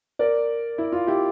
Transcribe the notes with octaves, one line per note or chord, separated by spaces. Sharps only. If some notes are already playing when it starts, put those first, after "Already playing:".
A#4 D5
E4
F4
E4 G4